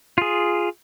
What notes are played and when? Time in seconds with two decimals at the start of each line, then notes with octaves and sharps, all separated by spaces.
0.18 F4 G#4